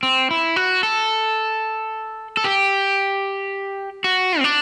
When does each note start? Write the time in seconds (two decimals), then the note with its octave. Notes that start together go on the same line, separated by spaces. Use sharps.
0.03 C4
0.31 E4
0.56 F#4
0.83 A4
2.37 A4
2.44 G4
4.04 F#4
4.39 C4
4.44 D4